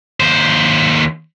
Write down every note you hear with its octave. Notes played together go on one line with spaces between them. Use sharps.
D#2 C5